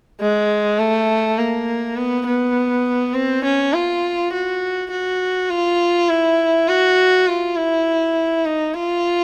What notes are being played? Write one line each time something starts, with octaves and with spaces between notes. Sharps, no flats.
G#3
A3
A#3
B3
B3
C4
C#4
F4
F#4
F#4
F4
E4
F#4
F4
E4
D#4
F4